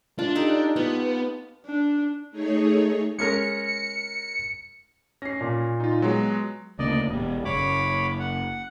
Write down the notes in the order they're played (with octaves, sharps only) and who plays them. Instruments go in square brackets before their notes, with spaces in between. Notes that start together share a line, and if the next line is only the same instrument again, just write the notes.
[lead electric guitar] D4 [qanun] F4
[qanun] D#4 G4 A4
[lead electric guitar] B3 [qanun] F4
[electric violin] D4
[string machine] A3 D#4 G#4 C#5
[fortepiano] G#3 C#4 A#4 [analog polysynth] C#7
[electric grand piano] C#4 [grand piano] A#6 C7
[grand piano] A#2
[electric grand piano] D#4 F4
F#3 G#3 B3
[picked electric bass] D2 C#3 A#3 [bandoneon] D5 D#5
[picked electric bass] E1 B2 [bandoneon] G3
[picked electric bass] F#1 [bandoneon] C#5 B5 D6
[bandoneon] F#5